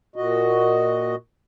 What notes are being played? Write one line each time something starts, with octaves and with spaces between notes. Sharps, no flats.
A#2 F#4 D#5